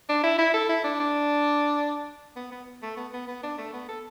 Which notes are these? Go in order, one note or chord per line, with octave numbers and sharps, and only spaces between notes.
D4
E4
E4
A4
E4
D4
D4
B3
B3
A3
B3
B3
B3
D4
A3
B3
A4